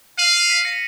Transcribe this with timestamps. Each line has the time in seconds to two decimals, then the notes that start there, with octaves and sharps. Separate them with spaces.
0.18 F5 D#7 F#7
0.34 C#7 F7
0.49 B6 D#7
0.65 A#6 C#7